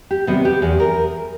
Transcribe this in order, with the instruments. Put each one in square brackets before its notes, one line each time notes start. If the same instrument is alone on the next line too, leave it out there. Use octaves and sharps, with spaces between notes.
[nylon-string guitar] G4
C3 D#3 G3 B3 F#4
G4
E2 G#4
A#4